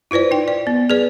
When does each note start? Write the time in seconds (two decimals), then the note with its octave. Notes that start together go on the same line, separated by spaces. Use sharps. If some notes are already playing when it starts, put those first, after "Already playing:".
0.11 E4 F4 B4 C5 D5
0.31 D#4 G5
0.48 D5
0.67 B3
0.90 G#4 B4 D5